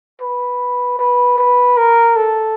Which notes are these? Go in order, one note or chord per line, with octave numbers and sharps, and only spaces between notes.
B4
B4
B4
A#4
A4